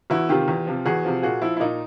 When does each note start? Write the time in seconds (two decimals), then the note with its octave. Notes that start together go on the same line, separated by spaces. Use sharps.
0.10 E2 E4 F#4
0.29 C3 D#3 F4 G4
0.48 E2
0.67 C3 F3
0.85 E2 F#4 G#4
1.05 C3 F3
1.22 A#2 F#4 G#4
1.41 F3 E4
1.57 E4
1.60 A#2 D#4